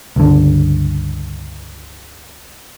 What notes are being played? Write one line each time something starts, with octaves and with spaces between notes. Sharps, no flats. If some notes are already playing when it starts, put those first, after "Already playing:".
C#2 G2 D3